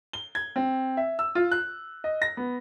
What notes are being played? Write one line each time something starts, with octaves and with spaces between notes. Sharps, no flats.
G7
G#6
C4
E5
E6
F4
F#6
D#5
A#6
B3